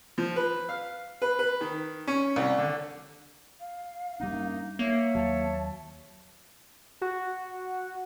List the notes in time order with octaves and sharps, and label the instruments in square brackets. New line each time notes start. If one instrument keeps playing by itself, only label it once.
[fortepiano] F3
B4
F5
B4
B4
D#3
C#4
C2
D3
[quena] F5
[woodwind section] F#2 A#3 D#4 [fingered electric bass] G3 A3 D4
[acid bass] A#3 [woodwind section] C#5 E5
[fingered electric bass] D#2 F#3 [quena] A5
[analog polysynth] F#4